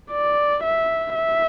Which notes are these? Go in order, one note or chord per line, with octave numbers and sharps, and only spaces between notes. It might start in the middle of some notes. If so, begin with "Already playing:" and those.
D5
E5
E5